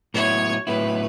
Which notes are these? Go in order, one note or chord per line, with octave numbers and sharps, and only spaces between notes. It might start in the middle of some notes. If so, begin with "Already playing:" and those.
A2 F#3 B3 E4 C#5
A2 F#3 B3 E4 B4